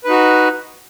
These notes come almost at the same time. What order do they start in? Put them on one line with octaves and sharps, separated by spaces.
B4 D#4 F#4